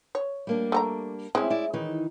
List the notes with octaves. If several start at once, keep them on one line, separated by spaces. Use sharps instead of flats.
C#5
G3 A#3 D4
A3 A4 A#5
G#3 C4 C#4 E4
E4 D5
D#3 E3 D#4